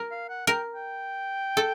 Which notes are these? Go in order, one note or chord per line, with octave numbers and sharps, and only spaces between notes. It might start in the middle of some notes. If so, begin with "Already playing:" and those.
Already playing: A#4
F5
F#5
A#4 G5
G5
A4